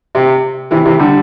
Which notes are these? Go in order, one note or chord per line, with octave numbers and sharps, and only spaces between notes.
C3
C3 E3
C3 E3
D3 G3